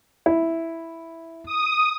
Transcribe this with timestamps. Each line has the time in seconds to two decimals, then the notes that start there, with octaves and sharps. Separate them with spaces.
0.26 E4
1.46 D#6